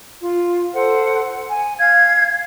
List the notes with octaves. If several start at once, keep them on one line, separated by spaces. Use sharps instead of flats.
F4
A4 C5 F#5
G#5
F5 G#6